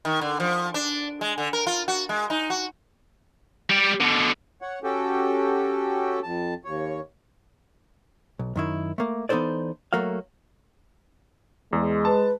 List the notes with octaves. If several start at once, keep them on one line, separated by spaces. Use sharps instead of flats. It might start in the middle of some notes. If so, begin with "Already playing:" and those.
D#3
D3
F3
D4
G#3
D3
A#4
F4
F#4
G#3
D#4
F#4
G3 G4
B2 D3
C#5 F#5
C#4 F#4 G4 A4 G5
F2 A5
D#2 C#5
B1
F#2 D#3 E4
A3 A#3
E3 B3 D#4 A4 C5 D5
F#3 A3 A#3 F#4 F5
E2 G#3
B4 A5